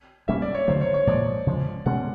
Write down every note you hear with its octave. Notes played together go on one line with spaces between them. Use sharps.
B2 G3 A#3 C#4 E5
D5
C#5
D3 F#3 A3 C5
C#5
C#5
A#2 F3 G#3 D5
C#3 F3 G#3
B2 G#3 C#4 F#5